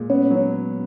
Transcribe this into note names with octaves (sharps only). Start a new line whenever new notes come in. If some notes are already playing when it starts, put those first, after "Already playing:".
Already playing: A#2 G#3
B3 C#4
F#3